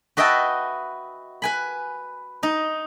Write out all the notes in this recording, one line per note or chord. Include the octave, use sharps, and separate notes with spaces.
F#4 B4 D#5 E5 G5 A5
B4 G#5 B5
D#4 D#5